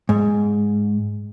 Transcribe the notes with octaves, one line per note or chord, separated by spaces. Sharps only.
G#2